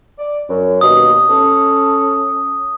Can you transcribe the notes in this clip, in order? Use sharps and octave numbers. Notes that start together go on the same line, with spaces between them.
D5
F#2
D#2 B2 D#6
C#4 A4